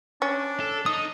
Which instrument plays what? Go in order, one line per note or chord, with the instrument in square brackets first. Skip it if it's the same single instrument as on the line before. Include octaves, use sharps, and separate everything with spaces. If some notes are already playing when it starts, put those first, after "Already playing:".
[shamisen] C#4 [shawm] D4
[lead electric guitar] A4
[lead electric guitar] D#4 [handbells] D#6